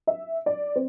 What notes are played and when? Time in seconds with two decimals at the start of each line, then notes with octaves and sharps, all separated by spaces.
0.07 E5
0.46 D5
0.76 C4